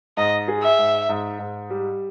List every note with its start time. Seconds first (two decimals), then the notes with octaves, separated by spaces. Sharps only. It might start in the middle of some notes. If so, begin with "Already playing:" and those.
0.17 G#2 D#5
0.48 G#4
0.63 E5
0.79 G#2
1.09 G#2
1.39 G#2
1.70 G3